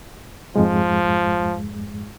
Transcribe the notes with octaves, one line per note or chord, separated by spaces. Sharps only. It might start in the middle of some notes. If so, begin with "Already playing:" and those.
F2 G#2 F3 G#3